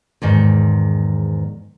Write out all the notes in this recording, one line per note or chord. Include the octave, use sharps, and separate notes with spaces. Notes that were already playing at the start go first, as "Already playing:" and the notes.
E2 G#2 D#3